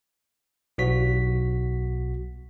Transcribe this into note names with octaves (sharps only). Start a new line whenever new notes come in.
B1 F#4 B6